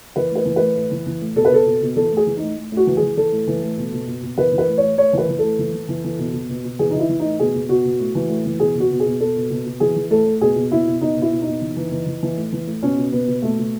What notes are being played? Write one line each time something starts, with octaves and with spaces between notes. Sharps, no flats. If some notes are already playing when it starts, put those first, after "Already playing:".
E3 B4
A2 B4
E3
A2 B4
A2
E3
E3
A2
B2 A4
B4
B2 A4
B2
B2
E3 A4
A2 G#4
E3
A2 D#4
A2
A2 F#4
E3
G#4
E3
E3 A4
A2
E3
A2
B2
B2
B2
B2
E3 B4
E3
B4
A2
C#5
A2
A2 C#5
E3 B4
E3
A2 A4
E3
E3
E3
E3
B2
B2
B2
B2
E3 G#4
D#4
E3
E4
E3
D#4
A2
B2 G#4
B2
B2 F#4
B2
A2
E3
A2
E3
B2 G#4
B2 F#4
B2
G#4
B2
B2 A4
B2
B2
B2
E3 G#4
E3
A2 A4
A2
B2 G#4
B2
B2 E4
B2
B2 D#4
B2
E4
B2
B2 D#4
E3
E3
E3
E3
E3
A2
E3
A2
B2 C#4
B2
B2 B3
B2
B2 A3
B2